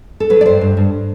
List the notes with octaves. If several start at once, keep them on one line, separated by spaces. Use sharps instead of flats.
A4
F#3 B4
D5
G2 C5
G2
G2